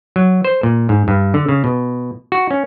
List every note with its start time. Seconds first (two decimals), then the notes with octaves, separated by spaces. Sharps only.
0.16 F#3
0.45 C5
0.63 A#2
0.89 G#2
1.08 G2
1.34 D3
1.49 C#3
1.64 B2
2.32 F#4
2.51 C#4